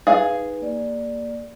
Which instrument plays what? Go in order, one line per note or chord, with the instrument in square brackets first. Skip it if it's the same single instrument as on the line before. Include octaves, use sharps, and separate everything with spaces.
[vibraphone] D#4 B4 [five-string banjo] G#4 F5
[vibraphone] A#3 D5